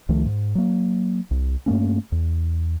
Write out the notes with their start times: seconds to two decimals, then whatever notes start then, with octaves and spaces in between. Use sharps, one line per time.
0.09 C#2 D#3 F3 A3
0.25 G#2
0.55 F#3 A#3
1.31 C2
1.66 G2 A3 A#3 C#4
2.12 E2